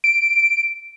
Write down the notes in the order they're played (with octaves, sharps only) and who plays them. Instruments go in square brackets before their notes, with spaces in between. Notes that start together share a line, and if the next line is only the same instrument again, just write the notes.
[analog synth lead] D7